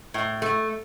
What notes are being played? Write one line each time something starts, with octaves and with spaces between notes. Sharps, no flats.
A2
A3